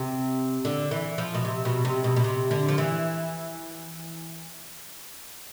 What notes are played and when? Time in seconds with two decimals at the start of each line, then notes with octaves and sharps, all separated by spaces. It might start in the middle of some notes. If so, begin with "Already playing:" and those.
Already playing: C3
0.65 D3
0.91 E3
1.18 F3
1.34 B2
1.45 C3
1.65 B2
1.85 C3
2.04 B2
2.16 B2
2.24 C3
2.51 D3
2.69 F3
2.78 E3